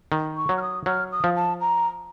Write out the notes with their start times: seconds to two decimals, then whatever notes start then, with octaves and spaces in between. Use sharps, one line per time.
0.12 D#3
0.36 C#6
0.49 F#3
0.57 F6
0.62 D#6
0.86 F#3 F6
1.12 D#6
1.24 F3
1.36 A5
1.61 A#5